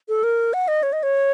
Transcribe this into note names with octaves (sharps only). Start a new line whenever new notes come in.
A4
A#4
F#5
D#5
C#5
D#5
C#5